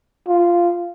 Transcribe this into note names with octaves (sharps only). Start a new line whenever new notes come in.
F4